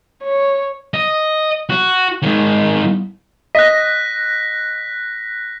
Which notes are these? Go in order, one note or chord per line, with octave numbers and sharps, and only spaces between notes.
C#5
D#5
F#4
G#2 D#3
D#5 F#6 A#6 B6